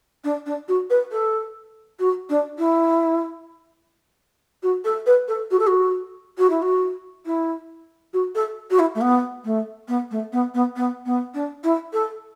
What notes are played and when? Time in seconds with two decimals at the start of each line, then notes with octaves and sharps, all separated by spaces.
0.24 D4
0.46 D4
0.68 F#4
0.90 B4
1.11 A4
1.99 F#4
2.29 D4
2.58 E4
4.63 F#4
4.84 A4
5.06 B4
5.28 A4
5.51 F#4
5.59 A4
5.67 F#4
6.38 F#4
6.50 E4
6.62 F#4
7.25 E4
8.13 F#4
8.35 A4
8.70 F#4
8.79 E4
8.95 A3
9.01 B3
9.45 A3
9.88 B3
10.11 A3
10.32 B3
10.54 B3
10.76 B3
11.05 B3
11.34 D4
11.63 E4
11.93 A4